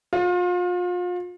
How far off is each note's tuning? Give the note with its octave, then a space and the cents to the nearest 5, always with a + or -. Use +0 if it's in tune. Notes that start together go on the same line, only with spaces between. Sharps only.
F4 +35